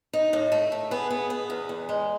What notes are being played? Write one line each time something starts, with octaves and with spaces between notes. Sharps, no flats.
D#4
A2
A3
A3
B3 G#4
B3
B3
E2
E2
G#3